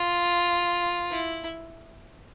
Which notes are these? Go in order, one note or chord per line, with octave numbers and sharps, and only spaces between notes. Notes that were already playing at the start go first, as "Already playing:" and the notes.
Already playing: F4
E4